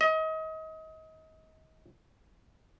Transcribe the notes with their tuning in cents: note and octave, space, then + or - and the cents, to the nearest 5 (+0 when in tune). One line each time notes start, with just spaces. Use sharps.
D#5 +30